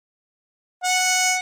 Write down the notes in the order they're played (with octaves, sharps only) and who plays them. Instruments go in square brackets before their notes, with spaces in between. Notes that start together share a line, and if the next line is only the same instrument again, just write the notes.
[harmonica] F#5